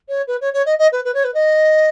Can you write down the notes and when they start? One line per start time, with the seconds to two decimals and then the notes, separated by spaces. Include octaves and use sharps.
0.09 C#5
0.28 B4
0.41 C#5
0.54 C#5
0.66 D#5
0.79 D#5
0.92 B4
1.05 B4
1.14 C#5
1.24 B4
1.34 D#5